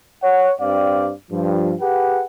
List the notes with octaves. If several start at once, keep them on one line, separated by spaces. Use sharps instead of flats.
C#5 F#5
G2 C4 D5 F5
G2 F3
G4 G#4 B4 F#5